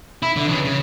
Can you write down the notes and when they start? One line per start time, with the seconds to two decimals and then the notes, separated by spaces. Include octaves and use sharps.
0.23 E4
0.36 D3
0.48 C#3 E3
0.65 C#3